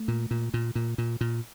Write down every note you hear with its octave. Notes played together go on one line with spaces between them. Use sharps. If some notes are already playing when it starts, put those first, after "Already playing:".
Already playing: A3
A#2
A#2
A#2
A#2
A#2
A#2